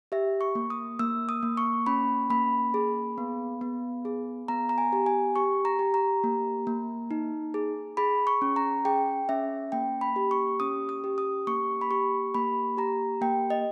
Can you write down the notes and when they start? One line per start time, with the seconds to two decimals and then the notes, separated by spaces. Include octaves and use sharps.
0.12 G4 E5
0.41 C#6
0.55 A#3
0.70 D#6
0.99 A#3 E6
1.29 D#6
1.43 A#3
1.57 C#6
1.86 C#4 B5
2.30 A#3 B5
2.74 G#4
3.18 B3
3.61 B3
4.05 G#4
4.48 B3 A#5
4.69 A#5
4.78 G#5
4.93 G4
5.06 G#5
5.36 G4 C#6
5.65 A#5
5.79 G4
5.94 A#5
6.24 A#3
6.67 A#3
7.11 D#4
7.54 G#4
7.97 G#4 B5
8.27 C#6
8.42 C#4
8.56 A#5
8.85 G#4 G5
9.29 C#4 E5
9.72 A#3 G5
10.01 B5
10.16 G4
10.31 C#6
10.60 C#4 D#6
10.89 D#6
11.04 G4
11.18 D#6
11.47 A#3 C#6
11.81 B5
11.91 G4 C#6
12.34 A#3 B5
12.77 G4 A#5
13.21 A#3 G5
13.50 D#5